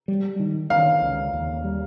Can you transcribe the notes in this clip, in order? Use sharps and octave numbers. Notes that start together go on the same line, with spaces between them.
G3
D#3
D#3 F5
C#2
D#2
G3